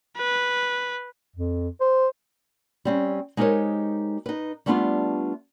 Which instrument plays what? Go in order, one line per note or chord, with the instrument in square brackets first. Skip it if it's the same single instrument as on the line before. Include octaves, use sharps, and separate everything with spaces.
[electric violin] B4
[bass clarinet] F2
C5
[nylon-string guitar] G3 C4 C#4
G#3 D#4 G4 A#4 C5 C#5
D#4 B4
G3 A3 B3 D4 D#4 F4